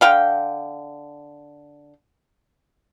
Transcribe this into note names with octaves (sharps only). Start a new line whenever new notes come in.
D3 F5 G5